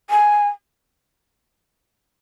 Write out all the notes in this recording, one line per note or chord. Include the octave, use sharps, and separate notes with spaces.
G#5